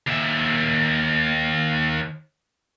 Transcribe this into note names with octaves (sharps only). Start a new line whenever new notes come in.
D#2 E5